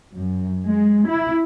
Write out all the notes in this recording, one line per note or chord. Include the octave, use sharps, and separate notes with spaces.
F#2
G#3
E4